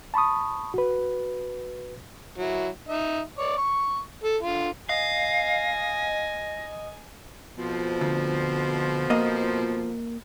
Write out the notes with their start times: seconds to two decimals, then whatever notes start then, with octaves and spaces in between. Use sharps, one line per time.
0.14 A5 B5 C#6 D#6
0.74 F#4 B4
2.38 F#3 E4
2.88 D#4 E5
3.38 C#5 D5
3.58 C#6
4.23 A4
4.43 D3 F4
4.89 D#5 F5 G#5 A#6
7.58 F2 B2 F3
8.01 D2
9.10 A#3 D#5